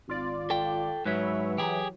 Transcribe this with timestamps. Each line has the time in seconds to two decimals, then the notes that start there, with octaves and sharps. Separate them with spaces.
0.08 G#1 F4 D5
0.50 A4 G5
1.05 G#2 F#3 B4 C#5 E5
1.58 E3 F#3 G4 G#4